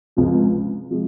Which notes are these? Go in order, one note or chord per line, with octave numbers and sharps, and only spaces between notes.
C#2 C3 F3 G#3
C3 F3 G#3